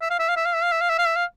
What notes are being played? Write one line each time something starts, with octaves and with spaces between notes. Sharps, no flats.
E5
F5
E5
F5
E5
F5
E5
F5
E5
F5
E5
F5
E5
F5